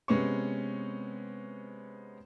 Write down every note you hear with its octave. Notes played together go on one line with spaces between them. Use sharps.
C3 G#3 B3 C#4 C#6